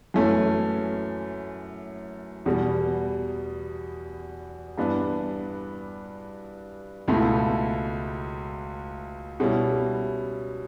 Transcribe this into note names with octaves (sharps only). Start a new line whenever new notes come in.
F#2 E3 A3 C#4
E2 B2 G3
G2 E3 B3 D4
C#2 B2 A3 E4
B2 G3 C#4 E4